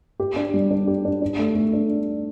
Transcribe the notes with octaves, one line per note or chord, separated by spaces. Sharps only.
G4
D4
G3
D4
G4
D4
D4
A3
A3
D4